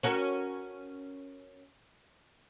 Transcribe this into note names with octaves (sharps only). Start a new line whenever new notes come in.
C#4 F#4 A#4